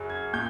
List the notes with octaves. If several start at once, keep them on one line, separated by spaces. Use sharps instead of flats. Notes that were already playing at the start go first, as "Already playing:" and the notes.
Already playing: F#2 C#3 F#3
G#6
A#2 G6